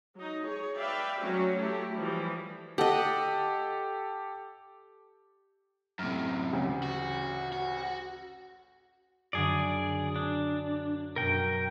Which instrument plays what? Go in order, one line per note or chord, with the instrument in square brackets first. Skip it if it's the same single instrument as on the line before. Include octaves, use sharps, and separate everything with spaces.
[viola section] F#3 D#4
G#4 C#5
B4 D5 E5 F5 G5
F#3 A3 C#4 F#4
A3 E4 G4
E3 F3 G3
[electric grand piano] G4 A4 [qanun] D#5 F#5
[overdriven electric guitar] F#2 C3 [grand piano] A2 F6
[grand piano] A1 D2 C#3
[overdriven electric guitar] F#4
F#4
[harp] F#2 D3 [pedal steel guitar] G#4 D5
[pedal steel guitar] D4
[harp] F#2 B2 [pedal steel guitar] A#4 G5